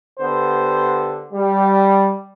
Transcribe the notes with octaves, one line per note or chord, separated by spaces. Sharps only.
D3 B3 G4 C5
G3